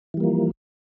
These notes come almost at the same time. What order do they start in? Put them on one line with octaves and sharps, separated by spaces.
E3 G3 A#3 F3